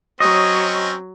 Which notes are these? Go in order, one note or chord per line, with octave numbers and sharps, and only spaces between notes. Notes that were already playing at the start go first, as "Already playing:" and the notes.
F#3 C4 C#4 C#5 D#5